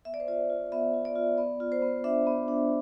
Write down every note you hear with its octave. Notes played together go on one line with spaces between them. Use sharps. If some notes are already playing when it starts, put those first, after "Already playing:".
B3 E5
D5
C5
F4 D5
F4
B3 E5
F4
D5
F4
B3 D5
F4
C5
B3
D4 E5
B3
D4